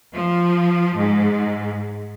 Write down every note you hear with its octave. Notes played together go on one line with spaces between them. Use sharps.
F3
G#2